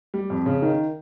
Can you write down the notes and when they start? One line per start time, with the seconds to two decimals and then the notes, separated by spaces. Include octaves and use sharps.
0.14 G3
0.30 F2
0.46 C#3
0.62 D#3